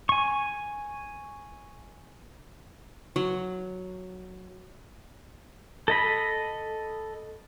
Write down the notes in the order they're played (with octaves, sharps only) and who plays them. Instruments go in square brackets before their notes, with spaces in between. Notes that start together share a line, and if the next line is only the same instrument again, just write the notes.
[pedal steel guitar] G#5 C#6
[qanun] F#3
[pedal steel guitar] A4 D#5 B5